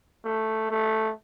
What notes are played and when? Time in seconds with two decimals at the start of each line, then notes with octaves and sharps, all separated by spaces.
0.24 A3
0.71 A3